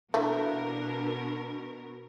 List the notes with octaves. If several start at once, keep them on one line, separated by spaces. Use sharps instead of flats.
B2 E3 A3 A#3 D4 A#4